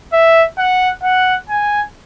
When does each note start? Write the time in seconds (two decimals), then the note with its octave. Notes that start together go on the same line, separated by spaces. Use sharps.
0.13 E5
0.58 F#5
1.03 F#5
1.50 G#5